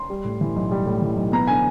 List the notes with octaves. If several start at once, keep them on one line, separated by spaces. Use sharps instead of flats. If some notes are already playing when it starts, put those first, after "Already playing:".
Already playing: C6
G3
A2
E3
B1
G3
A2
E3
B1
B3 A#5
D3 G#5